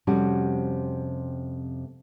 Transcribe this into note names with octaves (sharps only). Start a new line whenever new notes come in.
F2 C3 G3 C#4 F#4